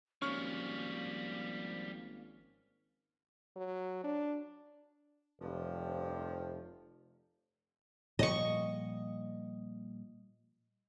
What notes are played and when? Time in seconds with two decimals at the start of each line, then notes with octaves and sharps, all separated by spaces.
0.22 G#1 F3 G3 A#3 C#4 C#6 F6
3.56 F#3
4.04 D4
5.40 F1 G2 C3 F3
8.19 A#2 F3 G3 D#5 C#6